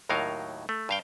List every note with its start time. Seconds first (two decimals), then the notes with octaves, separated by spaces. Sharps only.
0.09 D#2 A2 F#3 D#4 A#4 F5
0.69 A3
0.89 G2 F5 G5